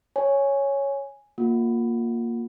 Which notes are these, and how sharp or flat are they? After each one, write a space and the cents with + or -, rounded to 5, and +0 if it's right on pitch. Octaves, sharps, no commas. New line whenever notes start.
C#5 +0 G#5 +0
A#3 +0 F4 +25 F#5 +0